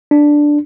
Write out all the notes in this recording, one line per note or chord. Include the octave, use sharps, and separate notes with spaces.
D4